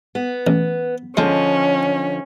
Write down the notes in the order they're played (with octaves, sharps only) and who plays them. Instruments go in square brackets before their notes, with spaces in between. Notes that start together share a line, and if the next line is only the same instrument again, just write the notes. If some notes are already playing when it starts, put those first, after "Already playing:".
[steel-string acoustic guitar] B3
[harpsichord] A1
[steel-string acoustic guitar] D3 F3 D#5 [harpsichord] G#3 [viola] C#4